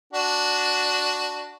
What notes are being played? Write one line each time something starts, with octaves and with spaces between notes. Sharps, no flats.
D4 F#4